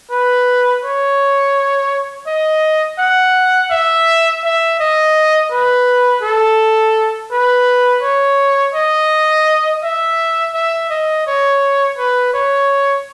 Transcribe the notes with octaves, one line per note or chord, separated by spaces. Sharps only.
B4
C#5
D#5
F#5
E5
E5
D#5
B4
A4
B4
C#5
D#5
E5
E5
D#5
C#5
B4
C#5